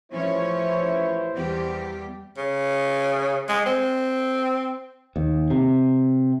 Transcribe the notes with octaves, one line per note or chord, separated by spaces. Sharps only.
A1 E3 F3 C#4 E4 C5 C#5
E2 G3 G4
C#3
G#3
C4
D#2
C3